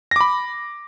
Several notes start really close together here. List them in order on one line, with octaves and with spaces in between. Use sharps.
A#6 D6 B5